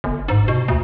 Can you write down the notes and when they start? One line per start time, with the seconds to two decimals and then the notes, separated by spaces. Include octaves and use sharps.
0.04 G1
0.28 G#2
0.48 B2
0.68 D2